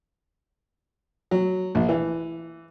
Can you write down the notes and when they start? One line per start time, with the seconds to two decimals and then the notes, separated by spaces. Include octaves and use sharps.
1.31 F#3
1.75 A#1
1.89 E3